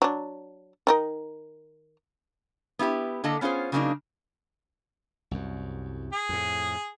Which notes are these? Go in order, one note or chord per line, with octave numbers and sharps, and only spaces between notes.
F#3 D4
D#3 D#4 A#4
B3 E4 F4 G4
D3 A#3 A4 D#5 A5
B3 C#4 F4 G#4 C5
C#3 F#3 A#3 C4 D4 D#4
C2 F#2
G#4
F2 A2